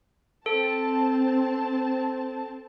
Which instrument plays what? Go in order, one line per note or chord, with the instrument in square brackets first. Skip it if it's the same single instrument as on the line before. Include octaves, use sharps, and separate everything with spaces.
[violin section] C4 A5 [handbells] A4